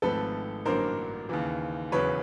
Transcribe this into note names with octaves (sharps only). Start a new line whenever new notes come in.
G#1 G#2 F3 A3 C4 A4 B4
A1 G2 D3 F#3 A#3 A#4 C5
D#2 C#3 E3
E1 E2 C#3 F#3 B4 C#5